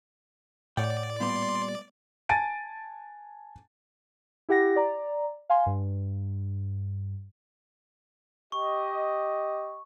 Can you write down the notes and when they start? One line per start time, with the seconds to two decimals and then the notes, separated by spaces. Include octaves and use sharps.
0.77 A2 C#5 D5 F#5 G5
1.20 A#2 G3 B3 C6
2.29 G#5 A5 A6 D7 D#7
4.49 E4 G4 F#5 A#6
4.76 D5 A#5
5.50 F5 G#5 C6
5.66 G2
8.52 G4 D#5 C#6